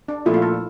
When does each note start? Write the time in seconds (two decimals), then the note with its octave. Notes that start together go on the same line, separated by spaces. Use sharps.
0.08 D4
0.25 A#2 F3 A3 E4
0.34 F4
0.42 A4